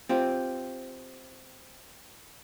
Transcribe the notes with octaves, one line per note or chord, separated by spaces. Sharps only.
C4 F4 G4